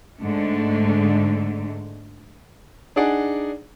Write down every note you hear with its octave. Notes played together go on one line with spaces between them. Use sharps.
G#2 D3 A3
D4 D#4 G#4 D5 F#5